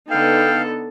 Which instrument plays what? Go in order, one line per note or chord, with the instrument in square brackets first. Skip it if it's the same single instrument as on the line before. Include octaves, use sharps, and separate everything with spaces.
[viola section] D3 B3 D#4 [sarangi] A4 [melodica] F5 [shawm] G5